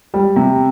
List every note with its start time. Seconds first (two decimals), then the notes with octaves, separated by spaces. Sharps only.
0.14 G3
0.36 C3